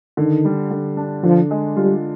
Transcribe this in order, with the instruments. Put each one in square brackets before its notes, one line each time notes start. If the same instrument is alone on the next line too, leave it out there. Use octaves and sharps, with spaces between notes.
[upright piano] D3 [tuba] D#3
[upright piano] G3
D3
D4
[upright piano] D3 [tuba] F3
[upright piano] G#3
[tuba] G3 [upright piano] F4